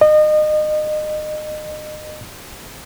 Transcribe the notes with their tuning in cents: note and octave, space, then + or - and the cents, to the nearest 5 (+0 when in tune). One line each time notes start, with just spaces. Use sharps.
D#5 -30